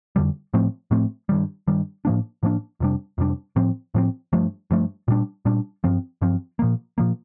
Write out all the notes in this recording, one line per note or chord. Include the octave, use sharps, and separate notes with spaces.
F2 D3 G3
A2 F3 A3 C4
A2 F3 A3 C4
G2 D#3 G3
G2 D#3 G3
A2 F3 A#3 D4
A2 F3 A#3 D4
F2 C3 G3 D4
F2 C3 G3 D4
A2 F3 C4
A2 F3 C4
G2 F3 A3
G2 F3 A3
A#2 G3 D4
A#2 G3 D4
G2 F3 C4
G2 F3 C4
A#2 F3 A#3
A#2 F3 A#3